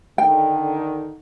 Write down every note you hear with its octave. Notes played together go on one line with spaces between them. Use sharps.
D3 D#3 G5